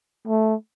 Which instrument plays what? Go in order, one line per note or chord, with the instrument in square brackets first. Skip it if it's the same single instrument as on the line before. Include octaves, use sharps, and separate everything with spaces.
[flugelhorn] A3